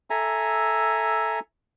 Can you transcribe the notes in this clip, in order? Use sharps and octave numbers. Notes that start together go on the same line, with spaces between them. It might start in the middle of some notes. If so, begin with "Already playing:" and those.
A4 E5 G#5 A#5